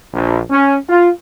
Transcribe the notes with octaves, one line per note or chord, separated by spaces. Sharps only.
A#1
C#4
F4